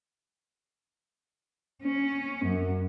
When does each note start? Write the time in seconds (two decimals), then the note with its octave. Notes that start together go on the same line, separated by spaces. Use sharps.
1.84 C#4
2.45 F#2